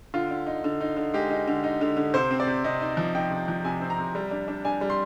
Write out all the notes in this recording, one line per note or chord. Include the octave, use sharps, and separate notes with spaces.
D3 F4
D3
D#4
D3
D#4
D3
G#3 G4
D#4
D3
D#4
D3
D3
C3 C5
C4
D5
C3
C3 D#5
D#4
F3
D#4 G5
C3
F3
C3 G#5
C4
A#5
C3
G3
D4
D4
D4 G#5
G3
C6